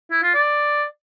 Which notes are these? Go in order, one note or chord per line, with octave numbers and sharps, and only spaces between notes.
E4
F4
D5